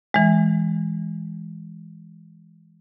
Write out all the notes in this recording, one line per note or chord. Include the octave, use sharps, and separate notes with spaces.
E3 G#3